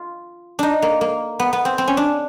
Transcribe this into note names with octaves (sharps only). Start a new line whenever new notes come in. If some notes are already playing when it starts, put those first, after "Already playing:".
Already playing: F4
D4 D#4
A#3
A#3
B3
B3
C4
C4
C#4
D4